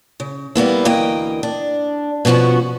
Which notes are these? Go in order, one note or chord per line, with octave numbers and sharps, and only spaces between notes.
C#3
G3 A#3 B3 E4
D2 E3 A#3 D#5 G5
D4
B2 F3 B3 C#4 F#4